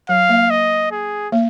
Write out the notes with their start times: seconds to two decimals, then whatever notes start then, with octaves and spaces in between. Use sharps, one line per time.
0.09 F#3 F5
0.29 A#3
0.50 D#5
0.91 G#4
1.32 A#3